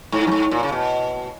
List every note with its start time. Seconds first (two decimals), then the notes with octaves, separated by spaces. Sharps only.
0.12 G#2
0.27 F#2
0.31 G#2
0.51 A#2
0.63 C#3
0.72 B2